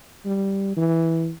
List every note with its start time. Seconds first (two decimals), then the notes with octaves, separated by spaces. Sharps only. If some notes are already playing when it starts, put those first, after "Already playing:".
0.25 G3
0.77 E3